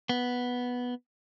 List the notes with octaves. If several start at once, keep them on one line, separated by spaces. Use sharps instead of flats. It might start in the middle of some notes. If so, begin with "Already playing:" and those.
B3